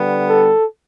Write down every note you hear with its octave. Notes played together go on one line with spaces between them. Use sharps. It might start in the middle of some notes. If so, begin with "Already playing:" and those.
Already playing: D3 G3 B3
A4